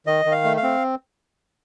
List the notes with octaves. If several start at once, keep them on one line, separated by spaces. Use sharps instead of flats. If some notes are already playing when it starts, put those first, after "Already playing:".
D#3 D#5
D#3
F5
A3
F5
C4